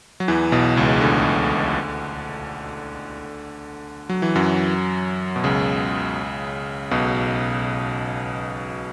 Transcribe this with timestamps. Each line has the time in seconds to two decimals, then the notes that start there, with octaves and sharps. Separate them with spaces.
0.20 F#3
0.28 E2 E3
0.52 B1 B2
0.77 C#2 C#3
1.01 D2 D3
4.09 F#3
4.22 E3
4.35 F#2 F#3
5.36 B2
5.44 C#2 C#3
6.91 B1 B2